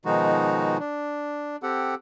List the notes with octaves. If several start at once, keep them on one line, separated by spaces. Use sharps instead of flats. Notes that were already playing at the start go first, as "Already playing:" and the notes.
B2 D#3 F3 G#3 D#4 F#4
D4
C4 G4 A4 F#5